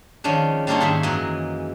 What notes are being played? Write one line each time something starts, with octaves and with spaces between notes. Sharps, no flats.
D#3 F3 G#3 C#4 D4
G3 A#3 D4 F4 C#5 D#5
G#2 D#3 G#4 E5
F#2 E3 G#3 D#5